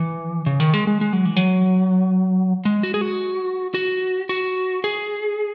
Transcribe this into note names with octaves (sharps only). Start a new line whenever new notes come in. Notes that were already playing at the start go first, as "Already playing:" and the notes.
Already playing: E3
C#3
D#3
G#3
G#3
G#3
F#3
E3
F#3
G#3
F#4
G#4
F#4
F#4
F#4
G#4